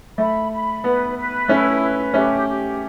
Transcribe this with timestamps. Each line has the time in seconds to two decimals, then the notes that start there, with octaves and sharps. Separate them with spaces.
0.18 A3 B5
0.51 B5
0.84 B3 B4
1.17 B4
1.48 A3 C#4 E4
1.82 B4
2.14 A3 C#4 G4
2.47 G4